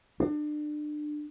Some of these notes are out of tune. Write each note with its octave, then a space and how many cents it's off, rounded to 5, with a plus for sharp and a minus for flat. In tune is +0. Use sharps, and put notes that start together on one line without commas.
D4 +30